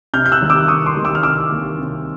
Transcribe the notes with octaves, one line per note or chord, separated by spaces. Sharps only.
C3 F6 G6
G6
E6 F#6
D#3 G3 A#3
D6 E6
C3 C#6 D#6
C6 D6
D#3 G3 A#3
D6 E6
F6
C3 D6 E6
D#3 G3 A#3
C3